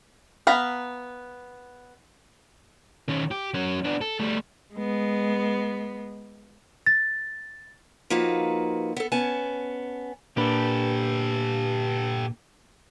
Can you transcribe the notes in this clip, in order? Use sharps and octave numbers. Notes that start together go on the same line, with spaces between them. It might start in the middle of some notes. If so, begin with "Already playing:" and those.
B3 F5 A#5 B5
D#3 C#4
G4
F#3 C#4
B3 D4
A4
G3 A3
G#3 B3
A6
F3 A#3 D#4 F#4 A4 B4
B3 A4
B3 C#4 G#5 A5
A#2 A#3 D4 G4 A4 B4